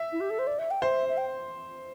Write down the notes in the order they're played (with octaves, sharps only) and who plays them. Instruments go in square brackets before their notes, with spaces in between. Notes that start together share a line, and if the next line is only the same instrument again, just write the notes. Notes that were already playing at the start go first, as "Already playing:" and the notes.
Already playing: [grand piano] E5
[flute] E4
G4
A4
C5
D5
E5
G5
[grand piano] C5 [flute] E5
[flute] E5
G5